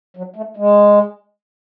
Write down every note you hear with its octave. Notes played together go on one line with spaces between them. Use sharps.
F#3
A3
G#3